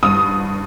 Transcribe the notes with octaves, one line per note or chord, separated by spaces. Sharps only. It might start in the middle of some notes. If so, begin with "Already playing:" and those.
G2 D#6